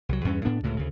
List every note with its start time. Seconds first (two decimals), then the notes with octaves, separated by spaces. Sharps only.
0.09 C2 F#3
0.25 E2 G2 C#4
0.45 A2 B3 D4
0.63 C#2 A2 C3
0.77 D2 C#3